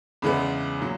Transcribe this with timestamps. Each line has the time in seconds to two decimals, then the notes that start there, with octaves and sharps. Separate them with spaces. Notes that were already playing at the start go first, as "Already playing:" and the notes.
0.22 E2 C#3 E3 G#3 B3 B5
0.81 A#2 F#3